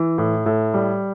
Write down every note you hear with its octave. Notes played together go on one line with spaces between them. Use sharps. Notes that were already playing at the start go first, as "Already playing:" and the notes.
Already playing: E3
A2
A2
G3